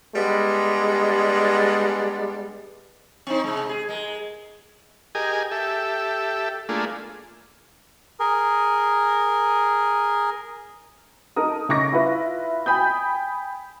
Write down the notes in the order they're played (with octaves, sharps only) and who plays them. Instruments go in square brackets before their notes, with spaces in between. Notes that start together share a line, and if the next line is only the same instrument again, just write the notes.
[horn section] G3 G#3 B3 D4
[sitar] C4 D#4
C3 G#3
G#4
G#3 A#4
[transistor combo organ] G4 G#4 A#4 D#5 G#5
G4 A4 E5
A3 A#3 D4 F4 G#4
[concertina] G#4 A#4
[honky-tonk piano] D#4 A4 A#4 D#6
C#3 D#4 C#6 D6 A#6
E4 F4 B4 E5
G5 G#5 B5 D#6 G6